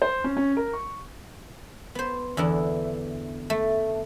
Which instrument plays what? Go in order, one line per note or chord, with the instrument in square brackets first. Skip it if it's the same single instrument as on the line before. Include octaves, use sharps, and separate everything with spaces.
[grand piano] C5
C#4
C#4
A#4
C#6
[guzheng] B3 C5
E2 D3 E3 E4
A3